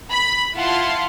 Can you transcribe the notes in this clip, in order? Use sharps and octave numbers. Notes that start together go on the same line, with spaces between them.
B5
E4 F4 F5 F#5 A5 C6